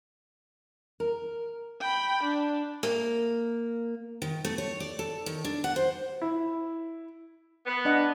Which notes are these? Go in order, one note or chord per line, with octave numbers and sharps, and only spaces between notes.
A#4
G5 B5
D4
A#3
D#3
A3
C#5
D5
A4
D#3
D4
F#5
C5
E4
B3
D4 D#5 F#5